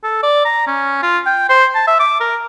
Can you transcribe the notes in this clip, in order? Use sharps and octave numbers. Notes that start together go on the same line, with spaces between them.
A4
D5
A#5
C#4
F4
G5
C5
A5
E5
D6
A#4